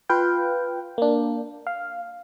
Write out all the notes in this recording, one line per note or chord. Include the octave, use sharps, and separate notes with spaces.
F4 B4 F5 G5
A#3 D4
F5